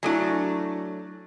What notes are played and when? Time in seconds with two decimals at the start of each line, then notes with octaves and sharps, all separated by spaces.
0.03 F#3 A3 D4 E4 F#4 G#5